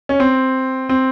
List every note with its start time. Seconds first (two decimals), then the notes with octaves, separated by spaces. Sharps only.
0.09 C#4
0.20 C4
0.89 C4